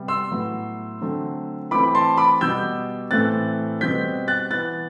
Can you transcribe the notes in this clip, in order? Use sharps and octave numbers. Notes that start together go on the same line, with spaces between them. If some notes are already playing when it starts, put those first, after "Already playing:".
Already playing: C3 G3 B3
C6 E6
A2 F#3 B3
D3 F#3 A3 C4
E3 A3 C4 B5 D6
B5
A5 C6
B5 D6
B2 G3 B3 E6 G6
A2 E3 A3 C4 F#6 A6
B2 G3 C4 G6 B6
F#6 A6
E3 B3 F#6 A6